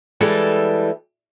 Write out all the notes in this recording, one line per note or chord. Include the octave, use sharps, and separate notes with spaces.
E3 G3 G#3 A4